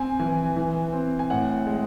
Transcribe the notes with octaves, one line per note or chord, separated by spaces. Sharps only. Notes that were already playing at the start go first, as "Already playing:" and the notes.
Already playing: C4 G#5
E3
E3
C4
G#5
A2 F#5
G#3